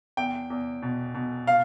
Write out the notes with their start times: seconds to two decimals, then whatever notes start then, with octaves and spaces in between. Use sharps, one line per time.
0.17 E2 G5
0.50 E2
0.82 B2
1.15 B2
1.47 F5